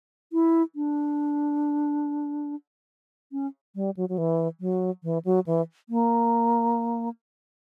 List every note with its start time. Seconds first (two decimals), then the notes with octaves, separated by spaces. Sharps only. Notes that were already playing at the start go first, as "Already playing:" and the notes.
0.33 E4
0.76 D4
3.32 C#4
3.75 G3
3.97 F#3
4.09 F#3
4.18 E3
4.60 F#3
5.03 E3
5.25 F#3
5.46 E3
5.89 A#3